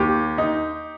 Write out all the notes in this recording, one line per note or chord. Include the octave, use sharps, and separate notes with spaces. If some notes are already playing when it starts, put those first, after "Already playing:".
Already playing: D#2 G4
D#4